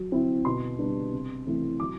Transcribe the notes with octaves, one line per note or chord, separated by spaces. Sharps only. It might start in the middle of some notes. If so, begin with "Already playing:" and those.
Already playing: F#3
C4 E4
B2 C6
G3 B3 D4
C3
E3 A3 C4 E4
F#3 D6